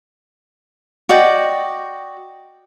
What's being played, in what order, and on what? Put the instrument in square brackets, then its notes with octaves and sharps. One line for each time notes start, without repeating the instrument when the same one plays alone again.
[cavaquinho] F#4 D5 D#5 G5